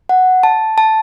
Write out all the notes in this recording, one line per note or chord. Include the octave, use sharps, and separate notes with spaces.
F#5
A5
A5